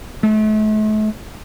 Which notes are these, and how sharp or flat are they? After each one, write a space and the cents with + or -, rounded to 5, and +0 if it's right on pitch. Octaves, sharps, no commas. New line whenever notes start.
A3 -40